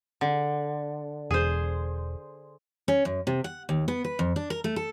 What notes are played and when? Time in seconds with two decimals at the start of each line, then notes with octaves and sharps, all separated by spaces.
0.21 D3
1.31 E1 G#4 C5
2.88 C#4
3.05 F#2
3.27 C3
3.44 F#5
3.69 D#2
3.88 B3
4.04 B4
4.19 F2
4.36 D4
4.50 A#4
4.64 A3
4.76 A4